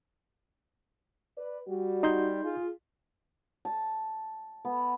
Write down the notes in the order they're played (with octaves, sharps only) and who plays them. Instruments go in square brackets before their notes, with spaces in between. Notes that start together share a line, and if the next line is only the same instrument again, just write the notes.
[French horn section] B4 D5
G3 F#4
[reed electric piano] D#4 C6 G6
[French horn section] F4 G#4
[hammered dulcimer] A5
B3